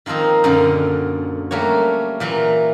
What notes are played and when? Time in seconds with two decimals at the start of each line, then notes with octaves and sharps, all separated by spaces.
0.06 D#3 F3 A#3 C4 D#4
0.44 F#2 A#2 D3
1.51 G3 A3 A#3 F#4 C#5
2.20 A#2 E3 F#3 A#5